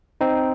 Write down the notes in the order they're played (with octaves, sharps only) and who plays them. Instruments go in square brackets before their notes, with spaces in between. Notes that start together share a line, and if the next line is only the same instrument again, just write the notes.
[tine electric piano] C4 D#4